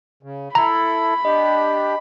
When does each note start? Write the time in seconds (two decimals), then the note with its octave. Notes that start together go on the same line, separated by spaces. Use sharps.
0.23 C#3
0.55 E4 A4 A#5 B5
1.25 D4 G4 D#5